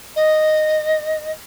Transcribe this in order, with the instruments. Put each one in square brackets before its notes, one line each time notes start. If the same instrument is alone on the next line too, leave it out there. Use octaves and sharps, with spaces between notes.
[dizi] D#5